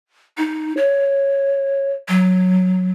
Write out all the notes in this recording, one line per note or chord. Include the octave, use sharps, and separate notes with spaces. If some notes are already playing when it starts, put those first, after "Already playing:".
D#4
C#5
F#3